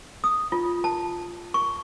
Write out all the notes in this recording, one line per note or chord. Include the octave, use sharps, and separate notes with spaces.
D#6
F4
A5
C#6